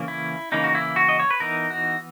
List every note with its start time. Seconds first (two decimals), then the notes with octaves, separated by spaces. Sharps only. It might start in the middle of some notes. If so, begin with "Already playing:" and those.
Already playing: C#3 E3 A#3 C#4
0.08 E4
0.52 C#3 E3 A#3 C#4 D#4
0.64 F#4
0.75 E4
0.96 F#4
1.09 D#5
1.20 C#5
1.30 B4
1.40 E3 B3 D#4 A#4
1.70 F#4